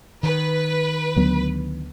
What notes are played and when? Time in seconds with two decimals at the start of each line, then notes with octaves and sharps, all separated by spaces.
0.23 D#3 B4
1.16 D2 F#3 B3